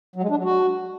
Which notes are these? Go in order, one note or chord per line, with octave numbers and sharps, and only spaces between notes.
F#3
G#3
D4
F#3
F#4